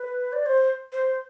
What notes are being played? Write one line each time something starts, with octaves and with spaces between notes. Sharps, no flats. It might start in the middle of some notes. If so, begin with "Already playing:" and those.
Already playing: B4
D5
C5
C5